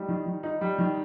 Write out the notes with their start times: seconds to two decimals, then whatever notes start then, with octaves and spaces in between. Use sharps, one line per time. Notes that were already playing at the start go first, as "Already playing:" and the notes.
Already playing: G3 D#4
0.08 D#3
0.26 D#3
0.43 D#4
0.61 G3
0.78 D#3